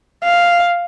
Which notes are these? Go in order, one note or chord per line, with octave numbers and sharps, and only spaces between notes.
F5